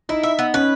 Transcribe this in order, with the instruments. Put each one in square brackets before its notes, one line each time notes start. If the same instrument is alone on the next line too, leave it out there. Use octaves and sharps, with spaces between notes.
[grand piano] D#4 [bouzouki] E4
[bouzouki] E5
B3
[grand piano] C#4 [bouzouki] B4